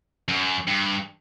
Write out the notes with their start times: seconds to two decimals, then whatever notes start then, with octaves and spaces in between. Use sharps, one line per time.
0.29 F#2
0.68 G2